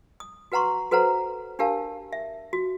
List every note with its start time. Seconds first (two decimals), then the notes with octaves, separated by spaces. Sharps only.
0.20 D#6
0.52 F#4 B4 F#5 A#5 C6 C#6
0.91 F#4 A4 B4 C5 F#5 A#5
1.59 D4 G4 A#4 F5 A5
2.13 E5
2.53 F#4